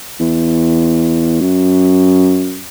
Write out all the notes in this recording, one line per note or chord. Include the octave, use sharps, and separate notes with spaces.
E2
F#2